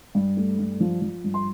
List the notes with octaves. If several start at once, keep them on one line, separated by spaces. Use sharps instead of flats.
G2
A3
G2
F3
F3
G2
C6